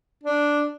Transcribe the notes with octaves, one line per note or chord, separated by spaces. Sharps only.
D4